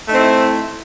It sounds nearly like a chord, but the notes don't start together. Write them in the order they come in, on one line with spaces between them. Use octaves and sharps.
A3 D#4 C4 E4